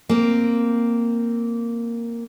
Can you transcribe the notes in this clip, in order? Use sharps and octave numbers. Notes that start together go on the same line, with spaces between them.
A#3 C4